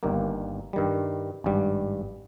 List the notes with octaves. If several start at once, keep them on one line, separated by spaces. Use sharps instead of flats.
G1 G2 D#3 A#3
G2 D#3 G3
G#1 G2 G3